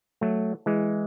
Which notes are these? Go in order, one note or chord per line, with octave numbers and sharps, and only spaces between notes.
F#3 A3
E3 G#3